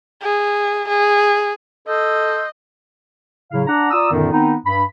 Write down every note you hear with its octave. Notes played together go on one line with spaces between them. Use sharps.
G#4
G#4
A4 D#5 C6 E6 G6
A2 C#3 F#3 E4 F5
D4 F#5 A#5
F4 D5 A#5 D#6 E6
F#2 A#2 D3 D#3 B3 D#4
D#3 B3 C4 D#4
G2 B5